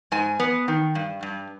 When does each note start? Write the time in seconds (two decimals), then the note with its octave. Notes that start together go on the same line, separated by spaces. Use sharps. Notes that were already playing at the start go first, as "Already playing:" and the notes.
0.12 G#2 G#5
0.40 B3
0.68 D#3
0.95 G2
1.23 G2